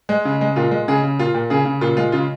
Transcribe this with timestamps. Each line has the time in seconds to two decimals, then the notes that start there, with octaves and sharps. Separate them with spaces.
0.09 G#3
0.25 C#3
0.41 G#3
0.56 A#2 F4
0.71 G#3
0.88 C#3 G#4
1.03 C#3
1.19 A#2 F4
1.34 A#2
1.50 C#3 G#4
1.65 C#3
1.81 A#2 F4
1.97 G#3 F4
2.12 C#3 F4